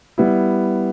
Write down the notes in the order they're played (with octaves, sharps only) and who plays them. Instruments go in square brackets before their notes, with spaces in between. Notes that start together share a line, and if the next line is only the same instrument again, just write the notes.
[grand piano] G3 B3 E4